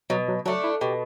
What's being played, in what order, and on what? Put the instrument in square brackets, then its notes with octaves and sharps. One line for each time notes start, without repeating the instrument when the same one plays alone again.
[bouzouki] B2 [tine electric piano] F#3
[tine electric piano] F#3
[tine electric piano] F#3 [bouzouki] A3 D4
[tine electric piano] E4
[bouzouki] B2 [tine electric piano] G4